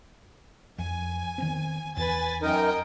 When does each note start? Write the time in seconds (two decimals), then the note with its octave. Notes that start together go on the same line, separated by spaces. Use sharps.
0.78 F2 G#5
1.38 D#3 B3 C4
1.97 E2 B4 G#5 A6
2.42 F#2 D#4 A#4 D#5 G5 G#5